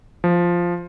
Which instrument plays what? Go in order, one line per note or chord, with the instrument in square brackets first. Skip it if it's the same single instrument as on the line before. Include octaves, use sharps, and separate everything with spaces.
[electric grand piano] F3